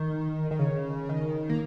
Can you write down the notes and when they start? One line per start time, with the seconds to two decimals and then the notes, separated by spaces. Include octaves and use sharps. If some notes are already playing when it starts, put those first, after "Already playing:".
Already playing: D#3
0.51 D#3
0.59 C#3
1.09 D#3
1.49 A#3